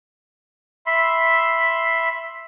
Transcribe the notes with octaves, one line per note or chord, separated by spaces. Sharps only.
E5 B5 C6